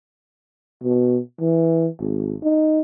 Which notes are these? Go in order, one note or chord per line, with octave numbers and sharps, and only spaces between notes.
B2
E3
G#1
D#4